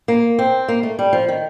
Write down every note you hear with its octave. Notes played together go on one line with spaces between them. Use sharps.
A#3
C4
A#3
A3
G3
F3
D#3